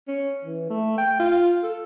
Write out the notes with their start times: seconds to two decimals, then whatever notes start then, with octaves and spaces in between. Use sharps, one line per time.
0.08 C#4
0.45 E3
0.70 A3
0.98 G5
1.19 F4
1.63 A4